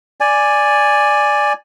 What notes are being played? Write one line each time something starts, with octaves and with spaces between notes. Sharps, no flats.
D5 G#5